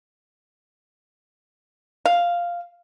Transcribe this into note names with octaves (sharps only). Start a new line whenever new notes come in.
F5